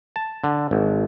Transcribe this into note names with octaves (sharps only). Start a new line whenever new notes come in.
A5
D3
G#1